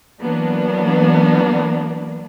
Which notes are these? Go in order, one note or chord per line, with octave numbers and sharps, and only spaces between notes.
E3 F#3 A#3 B3 D4